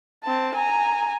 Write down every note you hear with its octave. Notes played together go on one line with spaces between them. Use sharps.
C4 A5
G#5 A#5